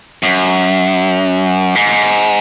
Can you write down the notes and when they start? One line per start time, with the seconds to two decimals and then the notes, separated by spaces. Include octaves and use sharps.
0.23 F#2
1.75 G#2